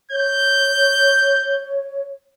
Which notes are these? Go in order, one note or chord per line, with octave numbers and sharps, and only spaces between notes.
C#5 G6